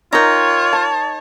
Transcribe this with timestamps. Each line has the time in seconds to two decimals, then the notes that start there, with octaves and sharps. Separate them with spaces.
0.13 D#4 F4 A#4 C#5 G5 A#5
0.73 A5